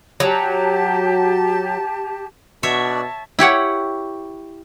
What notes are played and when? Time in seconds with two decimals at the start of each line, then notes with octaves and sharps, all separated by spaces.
0.20 F#3 G4 A5
2.63 B2 D4 F#4 C#5 D5 E5 A5
3.39 E4 G4 C#5 F#5